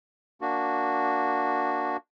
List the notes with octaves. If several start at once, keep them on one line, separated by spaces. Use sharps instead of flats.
A#3 D4 F#4